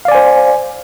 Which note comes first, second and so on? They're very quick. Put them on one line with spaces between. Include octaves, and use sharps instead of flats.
F5 D5 G#5 C5